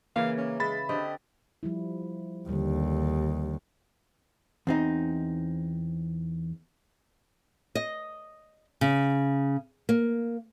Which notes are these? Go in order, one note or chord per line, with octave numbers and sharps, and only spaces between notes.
C#3 E3 A#3 F5
C#4
G#3 E5 B5 A6
D3 C4 G4 D#5
F3 G3 E4
D#2 D3 G3
E2 C4 D#4
D#5
C#3
A#3